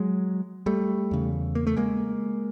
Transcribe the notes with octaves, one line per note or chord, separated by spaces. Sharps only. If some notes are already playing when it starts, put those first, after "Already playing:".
Already playing: F#3 G#3
G3 A3
E2 C#3
A#3
A3
G#3 A#3